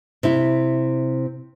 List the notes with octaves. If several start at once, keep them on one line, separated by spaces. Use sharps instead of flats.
C3 E4